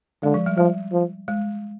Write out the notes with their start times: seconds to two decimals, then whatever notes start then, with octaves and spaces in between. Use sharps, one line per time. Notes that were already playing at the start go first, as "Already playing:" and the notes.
0.23 D3 G#3
0.34 F3
0.46 G3
0.57 F3 G3
0.92 F3
1.28 G#3